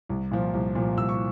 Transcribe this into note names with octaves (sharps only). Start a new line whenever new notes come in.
C2
A#2 F3
C2
A#2 F3
C2 E6
C#6